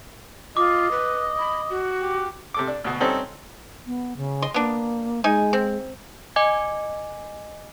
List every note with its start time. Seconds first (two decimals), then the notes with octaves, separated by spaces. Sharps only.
0.57 F4 D#5 D6
0.91 B4
1.39 B5
1.70 F#4
2.02 G4
2.54 C3 A4 D6
2.67 D4
2.84 D2 B2
3.00 G3 C4 C#4 D#4 A4
3.86 B3
4.17 C#3
4.42 D#5 C6
4.54 A#3 B3 D4
5.24 G#3 D#4 G#5
5.53 C4
6.36 D#5 G#5 D6 G#6